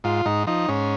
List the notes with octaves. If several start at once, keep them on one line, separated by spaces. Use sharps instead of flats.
G#2 F4
G#2 D#4
F3 D#4
G#2 C#4